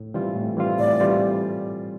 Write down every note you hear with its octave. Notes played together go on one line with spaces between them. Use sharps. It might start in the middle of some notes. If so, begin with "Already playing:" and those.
Already playing: A2
E3 G3 C4 F4
A2
E3 G3 C4 F4
A2 D5
E3 G3 C4 F4